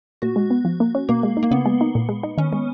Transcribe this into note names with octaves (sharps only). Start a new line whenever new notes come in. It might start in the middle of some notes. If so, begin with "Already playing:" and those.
A#2 F#4
G#3
B3
F3
A#3
C#4
B2 A#3
G#3
D#4
A#3
C#3 B3
G#3
D#4
A#2
G#3
D#4
D#3 C#4
G#3